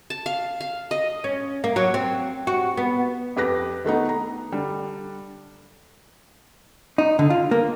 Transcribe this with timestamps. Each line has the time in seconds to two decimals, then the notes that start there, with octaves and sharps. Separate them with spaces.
0.10 A5
0.26 F5
0.61 F5
0.91 D#5
1.24 C#4
1.64 A#3
1.76 F#3
1.94 C4
2.47 F#4
2.77 B3
3.36 F2 G4 B4 A#6
3.85 D#3 A3 B3 D#4
4.09 A#5
4.52 D3 G3 D4
6.98 D#4
7.19 D3
7.30 F4
7.51 A#3